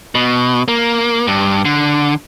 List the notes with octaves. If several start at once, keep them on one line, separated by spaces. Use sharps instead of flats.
B2
A#3
G2
D3